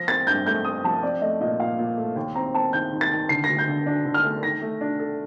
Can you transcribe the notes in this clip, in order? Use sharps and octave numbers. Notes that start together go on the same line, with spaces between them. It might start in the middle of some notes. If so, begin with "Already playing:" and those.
Already playing: F3 A#6
C4 A6
G2 G6
A3 G6
C4 D#6
F3 A5
C4 D5
A3 D#5
A#2 D#5
A#2 F5
A#2
A3
D#2 G5
C4 A#5
C4 A5
D#3 G6
D#3
A6
D#3
D3 C7
D2 A#6
G6
D3
D4
D3
F6
A3
D#3 A#6
A3
D4
A4